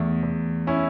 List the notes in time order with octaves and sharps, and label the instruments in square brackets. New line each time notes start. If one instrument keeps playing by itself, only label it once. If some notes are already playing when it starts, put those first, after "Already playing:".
Already playing: [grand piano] E2 [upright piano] A3
[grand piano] E2
[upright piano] C#4 E4